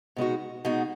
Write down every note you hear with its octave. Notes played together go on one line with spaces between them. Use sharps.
B2 G#3 D#4 F#4
B2 G#3 D#4 F#4